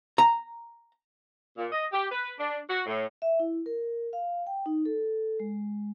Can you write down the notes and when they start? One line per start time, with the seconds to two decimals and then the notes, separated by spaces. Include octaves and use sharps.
0.18 A#5
1.57 A#2
1.71 D#5
1.92 G4
2.11 B4
2.38 D4
2.69 F#4
2.86 A2
3.22 E5
3.40 E4
3.66 A#4
4.13 F5
4.47 G5
4.66 D#4
4.85 A4
5.40 G#3